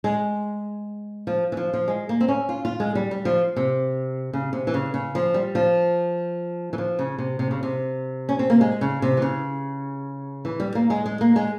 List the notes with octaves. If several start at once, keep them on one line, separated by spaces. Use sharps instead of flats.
G#3
F3
E3
F3
F3
G#3
A#3
C4
C#4
F4
F4
G#3
G3
G3
F3
C3
C#3
C3
E3
C#3
C#3
F3
G3
F3
E3
F3
C#3
C3
C3
C#3
C3
C#4
C4
A#3
G#3
C#3
C3
E3
C#3
E3
G3
A#3
G#3
G#3
A#3
G#3